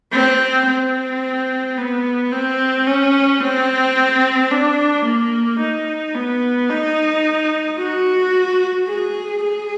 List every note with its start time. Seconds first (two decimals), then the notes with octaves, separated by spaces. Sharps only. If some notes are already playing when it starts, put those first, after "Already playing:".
0.12 C4
0.67 C4
1.77 B3
2.32 C4
2.87 C#4
3.41 C4
4.51 D4
5.05 A#3
5.60 D#4
6.15 B3
6.69 D#4
7.79 F#4
8.89 G#4
9.44 G#4